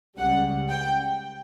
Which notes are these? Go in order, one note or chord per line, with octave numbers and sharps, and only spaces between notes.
C#2 C#3 G3 F#5
G5